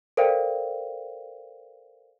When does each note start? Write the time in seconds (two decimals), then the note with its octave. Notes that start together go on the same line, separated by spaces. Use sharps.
0.17 A4 A#4 C5 D5 F5 G5